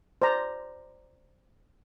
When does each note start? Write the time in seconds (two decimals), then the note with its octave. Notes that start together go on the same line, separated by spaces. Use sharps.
0.22 C5 D5 A#5